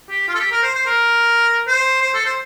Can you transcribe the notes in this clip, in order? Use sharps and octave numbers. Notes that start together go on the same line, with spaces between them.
G4
F4
A4
G4
A#4
C5
C5
A#4
C5
C5
A4
C5